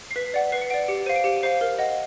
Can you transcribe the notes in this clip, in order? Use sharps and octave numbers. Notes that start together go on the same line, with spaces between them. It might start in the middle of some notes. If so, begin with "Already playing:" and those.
C7
B4 B6
D5 F#5
B4 C7
C#7
D5 F#5 D7
G4 C#7
C5 F5 D#7
D7
G4 C#7
C5 F5 C7
A#4
D#5 F#5